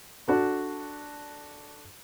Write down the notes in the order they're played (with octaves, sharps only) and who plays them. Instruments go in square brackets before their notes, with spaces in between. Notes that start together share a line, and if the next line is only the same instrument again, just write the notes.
[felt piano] D4 F#4 A4